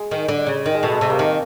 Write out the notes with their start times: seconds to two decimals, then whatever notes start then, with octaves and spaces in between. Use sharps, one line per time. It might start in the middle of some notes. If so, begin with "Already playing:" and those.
Already playing: G#3
0.11 D#3
0.28 D3
0.47 C#3
0.66 D#3
0.75 G#3
0.83 B2 A3
0.92 G#3
1.01 C3 A3
1.10 A#3
1.19 D#3